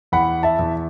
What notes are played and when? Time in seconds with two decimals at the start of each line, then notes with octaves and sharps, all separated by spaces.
0.12 E2 F#5 B5
0.43 E5 A5
0.59 E2